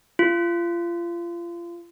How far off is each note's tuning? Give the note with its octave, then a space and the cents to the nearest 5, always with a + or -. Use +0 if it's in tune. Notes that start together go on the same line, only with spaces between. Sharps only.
F4 -30